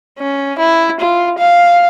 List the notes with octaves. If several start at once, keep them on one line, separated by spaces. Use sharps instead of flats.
C#4
E4
F4
F5